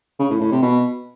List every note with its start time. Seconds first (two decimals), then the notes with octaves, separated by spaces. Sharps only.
0.19 C#3
0.30 A2
0.41 A2
0.52 C3
0.63 B2